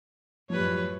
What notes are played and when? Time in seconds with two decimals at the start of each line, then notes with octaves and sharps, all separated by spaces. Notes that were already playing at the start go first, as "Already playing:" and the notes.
0.50 F#2 A2 F3 G3 B4 C#5